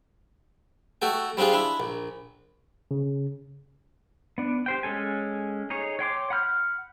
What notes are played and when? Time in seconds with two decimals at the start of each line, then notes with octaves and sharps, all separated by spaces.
1.02 A3 F#4 A4 G5
1.37 G3 C4 D4 F4 G#4
1.53 D4 E4
1.80 A#1
2.91 C#3
4.38 B3 D4
4.66 G4 C5 G5
4.83 G#3 C#4 A4 G#5
5.70 D#4 G#4 C#5
5.99 C#5 G5 C6 D6
6.30 F#5 B5 F6 G6